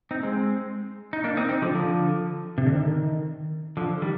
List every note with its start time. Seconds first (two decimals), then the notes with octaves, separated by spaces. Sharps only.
0.11 C4 D#4
0.23 G#3 C4
1.13 D#4
1.24 A#3 D4
1.37 C4 D#4
1.49 C4 D#4
1.62 D3 F3
1.75 D3 F3
2.58 C3
2.66 D3
2.76 D#3
3.77 D3 F3
4.02 D#3 G3